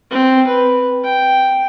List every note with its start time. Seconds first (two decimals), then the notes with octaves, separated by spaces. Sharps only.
0.11 C4
0.47 B4
1.04 G5